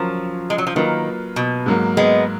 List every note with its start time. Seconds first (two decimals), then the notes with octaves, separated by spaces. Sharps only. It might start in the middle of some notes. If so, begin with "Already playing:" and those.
Already playing: F3 F#3 C#4 F4 A#4
0.50 G#3
0.58 F#3
0.67 F3
0.75 D#3 F#3 A#3 F4 B4
1.36 B2
1.66 G#2 F#3 A#3
1.97 G#3 B3